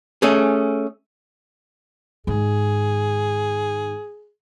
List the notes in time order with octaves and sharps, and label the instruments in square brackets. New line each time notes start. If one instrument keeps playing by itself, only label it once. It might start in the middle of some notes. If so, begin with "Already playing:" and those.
[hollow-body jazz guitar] A3 C#4 G#4
[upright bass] G#2 D#3 [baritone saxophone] G#4